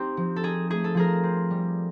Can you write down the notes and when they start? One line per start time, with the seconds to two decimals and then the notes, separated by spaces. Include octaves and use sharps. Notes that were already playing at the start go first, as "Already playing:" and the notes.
Already playing: C4 D#4 G4
0.17 F3
0.36 A4
0.43 D#4 G#4
0.70 A3 G#4
0.84 A4
0.95 F3 G#4 A#4
1.24 C4
1.50 G3